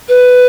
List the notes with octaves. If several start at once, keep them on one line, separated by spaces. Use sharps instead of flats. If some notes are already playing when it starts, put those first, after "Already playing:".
B4